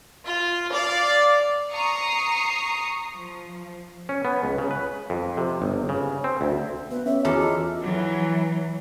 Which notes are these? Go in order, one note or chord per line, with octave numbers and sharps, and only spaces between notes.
F4
D5 F5
A#5 C#6 D#6 C7
F3
C#4
B3
C#2
C#3
B4
F2
C3
G1
C#3
C4
D2
B3 B4
C#4 C#5 E5
E2 F#4 A4 A#5 D6 F6
F4 D#5
E3 F#3